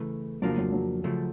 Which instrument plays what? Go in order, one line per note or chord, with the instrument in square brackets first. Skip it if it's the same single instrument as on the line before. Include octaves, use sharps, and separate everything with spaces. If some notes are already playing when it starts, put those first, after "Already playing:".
Already playing: [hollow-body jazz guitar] C#3 E3 A3
[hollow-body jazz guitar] F2 C#3 F3 A#3 D4 [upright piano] F#3
[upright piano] F#3
F#3
[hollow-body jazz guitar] C#3 F3 A3